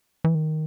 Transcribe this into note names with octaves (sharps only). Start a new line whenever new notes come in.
E3
D#3